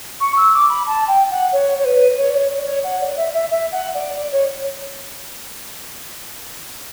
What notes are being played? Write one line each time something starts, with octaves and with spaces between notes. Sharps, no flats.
C#6
E6
D6
B5
A5
G5
F#5
C#5
C#5
B4
C#5
D5
C#5
D5
C#5
F#5
D5
E5
E5
E5
F#5
D5
D5
C#5